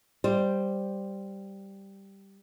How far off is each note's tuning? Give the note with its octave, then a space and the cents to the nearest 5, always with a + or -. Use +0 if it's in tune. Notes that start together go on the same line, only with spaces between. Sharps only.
G3 +0 C5 +0